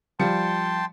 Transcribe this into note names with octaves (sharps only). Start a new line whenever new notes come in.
F3 G3 G5 A5 C6 C#7